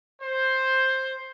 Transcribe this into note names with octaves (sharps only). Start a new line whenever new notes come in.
C5